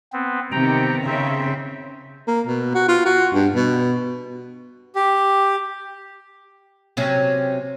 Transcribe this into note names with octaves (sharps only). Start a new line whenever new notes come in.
B3 C4
C3 D#3 B3 G5 A#5
C#3 C4 E5
A#3
B2
F#4
F4
F#4
G2
B2
G4
C3 F#3 C#4